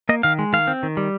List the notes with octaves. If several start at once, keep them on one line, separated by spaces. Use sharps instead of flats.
A#3 D#5
D#3 F5
G#3
D#3 F5
C4
D#3
G3